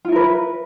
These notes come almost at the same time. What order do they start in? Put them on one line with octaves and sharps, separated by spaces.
F4 E4 A#4 B4